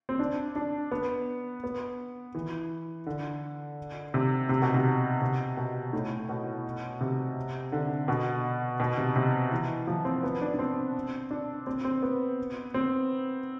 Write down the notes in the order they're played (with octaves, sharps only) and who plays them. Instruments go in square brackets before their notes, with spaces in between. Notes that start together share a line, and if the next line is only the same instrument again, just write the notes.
[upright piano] C4
D4
D4
B3
B3
E3
D3
C3
C3
B2
C3
C3
B2
A2
B2
C3
D3
B2
B2
C3
C3
E3
F3
C4
B3
D4
D4
C4
D4
C4
C4
B3
C4